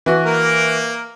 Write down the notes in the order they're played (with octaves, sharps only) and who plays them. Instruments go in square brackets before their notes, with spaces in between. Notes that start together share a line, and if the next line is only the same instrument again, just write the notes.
[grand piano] E3 F#4
[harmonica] A#3 A#4